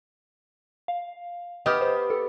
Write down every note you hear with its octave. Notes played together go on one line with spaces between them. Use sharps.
F5
B3 G4 D#5 D#6 F6
C5
A4